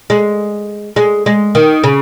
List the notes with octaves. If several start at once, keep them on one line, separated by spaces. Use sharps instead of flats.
G#3
G#3
G#3
D#3
C#3